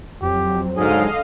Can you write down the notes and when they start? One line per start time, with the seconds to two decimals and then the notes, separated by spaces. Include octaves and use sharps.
0.22 F2 F#3 C4 G4
0.77 G#2 D3 F#3 G#3 D4 G#4 D#5 F5